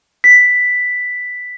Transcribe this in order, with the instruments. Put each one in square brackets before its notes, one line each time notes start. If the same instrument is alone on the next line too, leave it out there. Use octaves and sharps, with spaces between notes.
[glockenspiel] B6